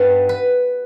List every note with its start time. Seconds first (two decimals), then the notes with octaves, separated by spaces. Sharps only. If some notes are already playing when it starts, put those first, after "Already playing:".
Already playing: G2 G3 B3
0.29 B4